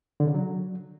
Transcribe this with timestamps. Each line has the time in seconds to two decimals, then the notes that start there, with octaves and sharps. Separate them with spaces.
0.20 D3
0.27 C#3
0.34 F#3